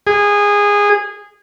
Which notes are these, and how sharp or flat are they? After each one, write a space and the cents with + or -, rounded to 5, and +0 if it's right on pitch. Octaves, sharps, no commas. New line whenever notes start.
G#4 -20